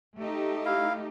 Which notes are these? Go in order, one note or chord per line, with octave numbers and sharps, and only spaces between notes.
A3 D#4 G4
E4 F5